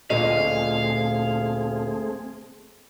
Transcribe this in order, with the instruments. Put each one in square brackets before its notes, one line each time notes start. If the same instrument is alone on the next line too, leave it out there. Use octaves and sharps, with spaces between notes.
[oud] D2 A#2 D#5 [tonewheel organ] A3 C4 G#4 [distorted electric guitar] F5